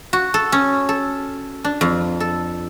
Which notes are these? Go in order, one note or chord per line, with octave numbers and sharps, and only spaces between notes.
F#4
A4
C#4
A4
D4
F2
A4